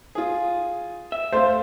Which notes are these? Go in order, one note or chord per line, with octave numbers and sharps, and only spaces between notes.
F4 G#4
E5
A3 C5 F5